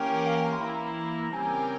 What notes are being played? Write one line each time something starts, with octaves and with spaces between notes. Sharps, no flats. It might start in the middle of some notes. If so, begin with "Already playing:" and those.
Already playing: E3 A#3 C#4 G4 A#4 G5
F5
G5
A#5
C6
E3 A#3 E4 A#5
C#3 G3 C4 G4 A#4 G#5